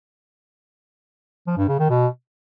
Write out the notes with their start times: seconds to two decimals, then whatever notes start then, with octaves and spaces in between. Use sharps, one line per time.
1.47 F3
1.58 G2
1.68 C#3
1.79 D#3
1.90 B2